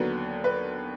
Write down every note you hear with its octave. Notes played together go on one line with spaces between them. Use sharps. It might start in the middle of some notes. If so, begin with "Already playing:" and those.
Already playing: D#2 D3 F#3 B3 B4
B4